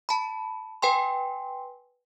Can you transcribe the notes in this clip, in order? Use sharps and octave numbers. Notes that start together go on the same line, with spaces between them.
A5 B5
B4 G5 G#5 C6